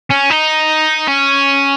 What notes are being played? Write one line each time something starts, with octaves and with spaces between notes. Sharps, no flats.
C#4
D#4
C#4